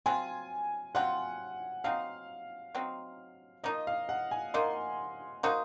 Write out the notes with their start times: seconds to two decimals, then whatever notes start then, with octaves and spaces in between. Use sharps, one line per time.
0.06 F#3 C4 F4 G#5
0.95 F#3 C4 F4 F#5
1.84 F#3 C4 D#4 F5
2.75 F#3 C4 D#4
3.64 F3 A#3 D#4 D#5
3.87 F5
4.09 F#5
4.31 G#5
4.54 F3 A#3 D#4 C6
5.43 A#3 D#4 F#4 C5 D#6